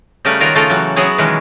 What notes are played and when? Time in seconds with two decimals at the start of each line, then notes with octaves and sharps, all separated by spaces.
0.25 C#3 G3 A3 A#4 B4
0.40 D#3 F4 F#4 A#4 C#5
0.55 C#3 A3 F4 A4 A#4 C#5
0.70 E3 F#3
0.96 F#3 B3 E4 F#4 G#4 C#5
1.18 B2 D#3 E3 F#3 G#3 C#4